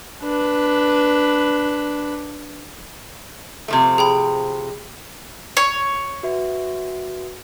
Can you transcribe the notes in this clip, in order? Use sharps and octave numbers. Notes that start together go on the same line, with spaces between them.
D4 B4
C3 F3 A3
G#4 G5 B5
C#5
F#4 B4 E5